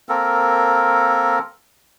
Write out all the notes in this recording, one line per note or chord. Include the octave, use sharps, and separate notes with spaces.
A#3 C4 A4 A#4